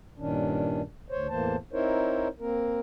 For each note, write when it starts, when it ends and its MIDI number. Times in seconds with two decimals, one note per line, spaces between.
0.18 0.82 43
0.18 0.82 46
0.18 0.82 51
0.18 0.82 61
0.18 0.82 62
1.10 1.27 38
1.10 1.27 72
1.10 1.27 73
1.29 1.56 40
1.29 1.56 45
1.29 1.56 52
1.29 1.56 58
1.29 1.56 72
1.29 1.56 81
1.73 2.28 60
1.73 2.28 63
1.73 2.28 64
1.73 2.28 70
1.73 2.28 72
1.73 2.28 73
2.40 2.80 58
2.40 2.80 60
2.40 2.80 70